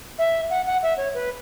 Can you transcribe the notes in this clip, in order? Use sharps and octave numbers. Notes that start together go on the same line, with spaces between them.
E5
F#5
F#5
E5
C#5
B4